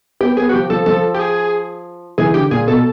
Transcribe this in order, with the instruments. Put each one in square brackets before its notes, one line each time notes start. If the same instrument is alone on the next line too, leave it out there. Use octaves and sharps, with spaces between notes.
[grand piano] B3 [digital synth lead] G4
[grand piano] B3 [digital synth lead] G#4
[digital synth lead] F#4
[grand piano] F3 [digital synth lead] G4
[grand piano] F3 [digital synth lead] A4
[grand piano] F3 [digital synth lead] A4
[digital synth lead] G4
G#4
[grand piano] E3 [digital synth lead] G#4
[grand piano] D3 [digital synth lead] G4
[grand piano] A#2 [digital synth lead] G#4
[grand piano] B2 [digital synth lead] A4